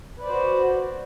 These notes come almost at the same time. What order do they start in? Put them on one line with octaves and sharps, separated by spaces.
B4 D5 C5 F#4